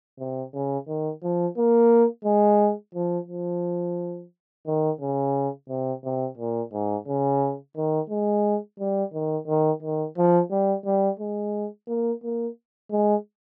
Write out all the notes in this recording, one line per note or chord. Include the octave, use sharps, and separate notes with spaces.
C3
C#3
D#3
F3
A#3
G#3
F3
F3
D#3
C#3
C3
C3
A#2
G#2
C#3
D#3
G#3
G3
D#3
D#3
D#3
F3
G3
G3
G#3
A#3
A#3
G#3